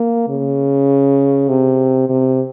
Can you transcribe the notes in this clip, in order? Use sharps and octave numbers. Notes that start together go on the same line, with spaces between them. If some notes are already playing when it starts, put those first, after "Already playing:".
Already playing: A#3
C#3
C3
C3